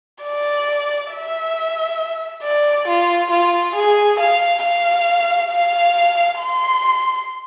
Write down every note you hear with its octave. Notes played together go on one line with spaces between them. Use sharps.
D5
E5
D5
F4
F4
G#4
F5
F5
F5
C6